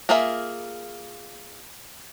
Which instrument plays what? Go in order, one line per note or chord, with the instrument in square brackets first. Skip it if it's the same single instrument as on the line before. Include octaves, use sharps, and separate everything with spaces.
[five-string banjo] A#3 F4 G#4 A#4 E5